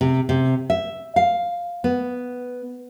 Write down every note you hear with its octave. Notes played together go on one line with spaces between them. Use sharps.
C3
C3
E5
F5
B3